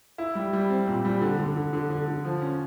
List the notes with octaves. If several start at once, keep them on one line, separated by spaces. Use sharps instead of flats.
E4
G3
G3
C4
A#2
G3
D3
D3
D3
D3
D3
D3
F3
C#4